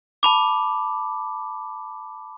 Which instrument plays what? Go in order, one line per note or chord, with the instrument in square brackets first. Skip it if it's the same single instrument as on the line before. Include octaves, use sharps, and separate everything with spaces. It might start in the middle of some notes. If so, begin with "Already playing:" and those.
[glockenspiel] A5 B5 D6